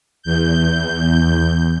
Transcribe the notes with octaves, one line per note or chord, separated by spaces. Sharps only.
E2 G6